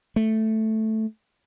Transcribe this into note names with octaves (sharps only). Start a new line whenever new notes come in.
A3